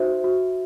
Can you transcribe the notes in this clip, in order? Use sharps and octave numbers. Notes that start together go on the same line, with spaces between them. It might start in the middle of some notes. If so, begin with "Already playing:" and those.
Already playing: D#4 F#4 C5 E5
F#4